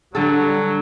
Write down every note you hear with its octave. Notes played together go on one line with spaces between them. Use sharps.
D3 F#3 G3 A4